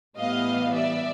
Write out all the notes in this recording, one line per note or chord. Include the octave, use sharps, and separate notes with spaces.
A2 E3 G3 B3 D#5 F5
D5 E5